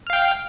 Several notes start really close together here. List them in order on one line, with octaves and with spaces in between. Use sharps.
F6 F5 G5